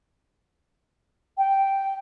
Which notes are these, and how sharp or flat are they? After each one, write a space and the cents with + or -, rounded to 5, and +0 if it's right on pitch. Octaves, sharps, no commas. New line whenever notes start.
G5 -5